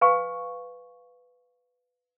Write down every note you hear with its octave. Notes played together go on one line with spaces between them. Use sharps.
B4 F5 G#5 C#6